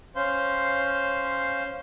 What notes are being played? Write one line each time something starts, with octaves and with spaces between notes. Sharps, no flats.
C#4 C5 F5 C6